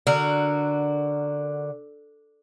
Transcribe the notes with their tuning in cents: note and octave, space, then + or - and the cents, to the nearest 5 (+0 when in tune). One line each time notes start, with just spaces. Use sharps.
D3 +0 F#4 +0 A#4 -15